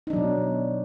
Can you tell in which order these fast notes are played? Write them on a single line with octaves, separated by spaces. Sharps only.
D#4 D4 F#3 B2